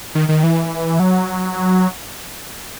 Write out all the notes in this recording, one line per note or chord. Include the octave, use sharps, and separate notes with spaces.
D#3
D#3
E3
F#3